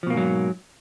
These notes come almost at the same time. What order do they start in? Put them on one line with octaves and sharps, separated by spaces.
F3 B2 A#3 G#2 F#3